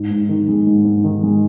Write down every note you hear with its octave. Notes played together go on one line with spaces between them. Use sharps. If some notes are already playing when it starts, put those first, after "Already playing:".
Already playing: G#2
G#2
D#3
G#3
G#2
G#2
D#3
G#3